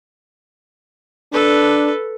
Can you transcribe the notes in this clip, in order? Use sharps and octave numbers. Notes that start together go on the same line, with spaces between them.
D4 A4 B4